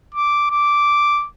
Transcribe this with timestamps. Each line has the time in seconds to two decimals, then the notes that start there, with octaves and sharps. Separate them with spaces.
0.15 D6
0.51 D6